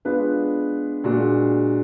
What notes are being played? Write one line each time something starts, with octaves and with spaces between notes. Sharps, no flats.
G#3 B3 D4 F4 B4
A#2 G#3 D4 F#4